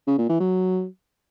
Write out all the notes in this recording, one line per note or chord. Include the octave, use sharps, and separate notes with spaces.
C#3
A#2
E3
F#3